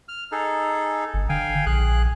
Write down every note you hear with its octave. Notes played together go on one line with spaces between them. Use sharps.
F6
D#4 G#4 A4
G1
D3 F5 G5 G#5
A#1 G#4 F#6